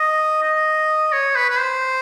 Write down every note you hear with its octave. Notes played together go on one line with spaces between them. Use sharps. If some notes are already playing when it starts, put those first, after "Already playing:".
Already playing: D#5
D#5
C#5
B4
B4
C5